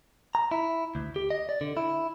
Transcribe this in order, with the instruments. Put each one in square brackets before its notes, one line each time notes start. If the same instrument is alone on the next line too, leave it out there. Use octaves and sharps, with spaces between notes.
[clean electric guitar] A#5
E4
D2
G4
D#5
D5
D3
E4